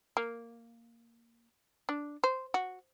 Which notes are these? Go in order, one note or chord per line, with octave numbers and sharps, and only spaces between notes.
A#3
D4
C5
F#4